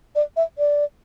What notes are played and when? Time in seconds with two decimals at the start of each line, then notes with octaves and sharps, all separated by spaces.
0.15 D5
0.37 E5
0.58 D5